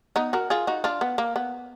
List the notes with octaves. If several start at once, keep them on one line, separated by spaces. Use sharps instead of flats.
B3 D#4
F#4 A#4
F4 G#4
D#4 F#4
D4 F4
B3
A#3
B3